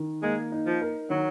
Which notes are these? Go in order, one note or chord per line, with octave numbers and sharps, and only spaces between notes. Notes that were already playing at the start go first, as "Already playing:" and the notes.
Already playing: D#3 A#4
G#3 A#3
D#4
F3
A#4
D#3 F#3